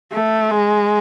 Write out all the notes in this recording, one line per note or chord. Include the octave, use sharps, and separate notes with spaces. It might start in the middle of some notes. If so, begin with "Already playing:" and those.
A3
G#3